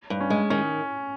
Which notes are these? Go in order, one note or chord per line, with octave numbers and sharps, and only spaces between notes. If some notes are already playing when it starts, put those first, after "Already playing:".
G2
C#4
G#3
D#3 C#4